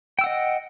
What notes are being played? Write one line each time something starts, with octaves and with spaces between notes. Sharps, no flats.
D#5 F#5 G5 E6